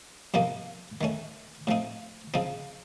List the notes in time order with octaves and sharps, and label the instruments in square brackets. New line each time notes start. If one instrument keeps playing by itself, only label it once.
[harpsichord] F2 C3 F3 A#3 D#4
D#3 A3 C#4
A2 F3 C4 D#4
C#3 F3 C4 D#4